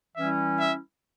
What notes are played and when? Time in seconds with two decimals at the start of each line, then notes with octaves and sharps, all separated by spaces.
0.16 E3 G3 C#4 E4 E5
0.59 E5